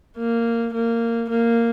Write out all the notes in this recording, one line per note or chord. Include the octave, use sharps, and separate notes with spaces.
A#3
A#3
A#3